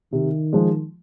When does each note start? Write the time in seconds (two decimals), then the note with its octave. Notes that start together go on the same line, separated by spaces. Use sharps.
0.12 C3 D#3
0.53 F3 G#3